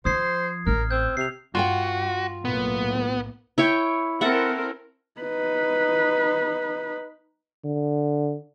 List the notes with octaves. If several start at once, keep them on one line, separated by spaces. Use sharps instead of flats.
F3 C5 D#6 G#6 C7
A1 A#4 F6
C4 E6 G6
C3 C7 F7
G2 F4 F#4 F#5 G5
B1 A2 A#3 B3
E4 C#5 G5
C4 E4 A4 A#4 E5 F#5
D#4 B4
D3